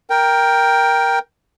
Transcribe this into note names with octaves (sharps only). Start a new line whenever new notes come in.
A#4 G5